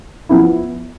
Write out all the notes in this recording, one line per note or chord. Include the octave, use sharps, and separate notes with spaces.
F3 B3 E4